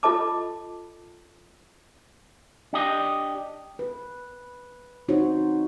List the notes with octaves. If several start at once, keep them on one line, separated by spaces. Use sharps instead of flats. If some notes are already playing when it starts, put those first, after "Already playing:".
F4 A4 D#5 A5 D6
D4 G4 D#5
B4
C4 D#4 F#4 C5 C#5